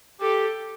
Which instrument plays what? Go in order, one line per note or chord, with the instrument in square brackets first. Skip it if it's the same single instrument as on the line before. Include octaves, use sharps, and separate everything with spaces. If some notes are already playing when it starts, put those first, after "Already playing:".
[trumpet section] G4 [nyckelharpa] A4